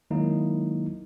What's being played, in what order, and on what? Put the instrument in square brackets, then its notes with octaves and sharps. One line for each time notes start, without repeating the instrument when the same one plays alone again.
[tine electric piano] D#3 F#3 G#3 A#3 D#4 E4